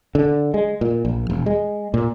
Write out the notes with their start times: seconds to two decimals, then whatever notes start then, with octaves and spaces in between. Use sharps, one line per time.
0.15 D3
0.54 G#3
0.81 A#2
1.05 A#1
1.30 E1
1.46 G#3
1.94 A#2